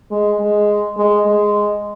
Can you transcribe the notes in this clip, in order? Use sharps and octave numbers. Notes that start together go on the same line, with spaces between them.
G#3
G#3
G#3
G#3